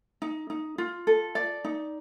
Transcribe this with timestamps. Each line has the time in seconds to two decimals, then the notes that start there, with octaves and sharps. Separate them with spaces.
0.22 D#4
0.50 D#4
0.78 F4
1.07 A4
1.35 D5
1.64 D#4